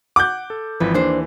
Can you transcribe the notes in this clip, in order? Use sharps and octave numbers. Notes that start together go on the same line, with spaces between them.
F#5 D6 F#6 G6
A4
G#1 E3 F3 B4
D#2 E3 D4 C5